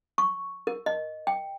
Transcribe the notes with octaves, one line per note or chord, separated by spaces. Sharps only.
C#6
A#4
D#5
G5